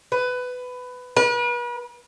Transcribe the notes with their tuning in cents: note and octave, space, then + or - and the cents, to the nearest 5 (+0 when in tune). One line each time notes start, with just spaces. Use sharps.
B4 +15
B4 -40